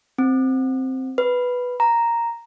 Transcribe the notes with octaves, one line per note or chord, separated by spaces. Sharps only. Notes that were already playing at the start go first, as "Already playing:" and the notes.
C4
B4
A#5